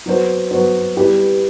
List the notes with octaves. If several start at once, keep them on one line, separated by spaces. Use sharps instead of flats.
F#3 B3 F#4 C5
F#3 B3 F#4 C5
G3 B3 E4 G4 B4